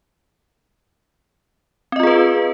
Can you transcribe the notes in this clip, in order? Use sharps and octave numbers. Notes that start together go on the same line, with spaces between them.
C4 F4 G#4 B4 D#5